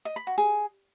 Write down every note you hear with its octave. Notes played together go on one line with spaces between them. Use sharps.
D#5
B5
F#4
G#4